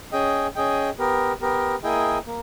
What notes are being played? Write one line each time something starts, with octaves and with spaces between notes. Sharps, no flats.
C#4 G#4 D#5 G5
C#4 G#4 D#5 G5
B3 G4 A#4
B3 G4 A#4
A#3 E4 G#4 D#5 G5
A#3